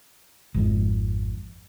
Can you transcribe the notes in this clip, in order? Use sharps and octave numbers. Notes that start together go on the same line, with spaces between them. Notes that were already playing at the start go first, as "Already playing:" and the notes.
G#1 F2 G#2